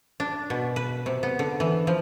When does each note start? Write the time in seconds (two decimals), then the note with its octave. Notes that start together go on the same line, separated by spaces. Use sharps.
0.20 D4
0.50 B2
0.76 B4
1.06 C3
1.23 B3
1.39 D3
1.60 E3
1.87 F3